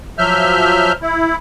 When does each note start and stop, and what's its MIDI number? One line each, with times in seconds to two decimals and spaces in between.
0.18 0.92 53
0.18 0.92 54
0.18 0.92 76
0.18 0.92 89
0.18 0.92 91
1.02 1.36 64